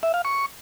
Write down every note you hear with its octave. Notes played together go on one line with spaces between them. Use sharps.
E5
F5
C#6